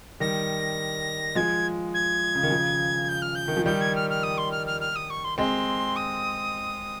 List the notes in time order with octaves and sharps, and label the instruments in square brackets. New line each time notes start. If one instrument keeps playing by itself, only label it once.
[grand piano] D#3 G3 [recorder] A#6
[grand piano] F3 G#3 [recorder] G#6
[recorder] G#6
[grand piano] C#3
D#3
C#3 F3
[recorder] G6
F6
G6
[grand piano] D#3
F3
[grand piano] D#3 G3 [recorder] G6
[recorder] G#6
F6
F6
D#6
C6
F6
F6
F6
D#6
C#6
C6
[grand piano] G#3 C4 [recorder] C6
[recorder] D#6